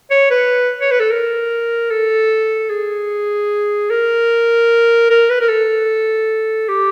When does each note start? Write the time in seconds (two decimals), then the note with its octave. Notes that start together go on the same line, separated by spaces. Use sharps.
0.11 C#5
0.30 B4
0.81 C#5
0.91 B4
1.00 A4
1.11 A#4
1.91 A4
2.70 G#4
3.90 A#4
5.10 A#4
5.30 B4
5.41 A#4
5.49 A4
6.69 G4